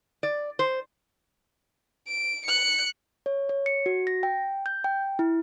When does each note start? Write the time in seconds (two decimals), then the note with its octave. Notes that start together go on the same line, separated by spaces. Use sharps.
0.23 D5
0.59 C5
2.08 D7
2.46 F#6 C#7
3.26 C#5
3.49 C#5
3.66 C#7
3.86 F#4
4.07 A#6
4.23 G5
4.66 G6
4.84 G5
5.19 E4